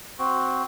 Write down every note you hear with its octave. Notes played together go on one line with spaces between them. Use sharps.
C4 F#4